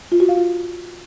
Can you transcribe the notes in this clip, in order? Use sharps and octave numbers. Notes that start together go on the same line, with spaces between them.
F4
F#4
F5
F4